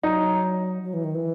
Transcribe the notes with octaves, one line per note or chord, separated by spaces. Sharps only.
F#3 D#4
F#3
E3
D#3
E3